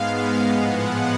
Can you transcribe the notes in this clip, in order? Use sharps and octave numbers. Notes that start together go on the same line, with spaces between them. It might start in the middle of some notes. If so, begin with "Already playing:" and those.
Already playing: G#2 G#3 B3 F5
A2 F3 G#3 B3 F#5